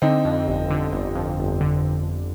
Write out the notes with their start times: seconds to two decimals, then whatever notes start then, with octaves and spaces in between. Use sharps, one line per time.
0.02 D3 C4 D#4
0.25 F2
0.48 G1
0.70 D3
0.93 G1
1.15 F2
1.39 G1
1.61 D3